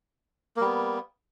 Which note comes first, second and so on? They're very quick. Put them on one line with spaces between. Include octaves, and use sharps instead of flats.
A#3 G3 B3